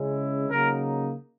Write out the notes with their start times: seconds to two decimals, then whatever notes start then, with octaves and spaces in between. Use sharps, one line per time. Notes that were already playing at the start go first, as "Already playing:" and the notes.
Already playing: C#3 G#3 C#4 E4
0.50 C#3 F#3 A#3 D#4 A#4